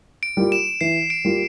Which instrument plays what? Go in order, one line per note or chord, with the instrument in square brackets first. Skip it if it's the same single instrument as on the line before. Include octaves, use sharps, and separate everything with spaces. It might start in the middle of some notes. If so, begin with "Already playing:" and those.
[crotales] D7
[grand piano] G3 A#3 F4
[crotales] E7
[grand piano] E3 [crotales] C7
[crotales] D7
[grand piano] G3 A#3 F4